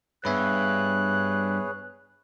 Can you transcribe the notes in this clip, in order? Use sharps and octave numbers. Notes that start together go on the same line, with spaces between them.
G2 B3 G#4 B4 C#5 E5 B5 F#6